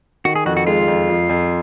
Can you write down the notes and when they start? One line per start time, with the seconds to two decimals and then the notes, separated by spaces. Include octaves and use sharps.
0.25 D#3 F#4
0.36 G#4
0.46 F2 F#4
0.57 F#4
0.67 G#3 F4
0.88 F2
1.09 F2
1.29 F2